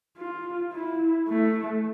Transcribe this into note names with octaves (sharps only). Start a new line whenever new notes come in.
F4
E4
A3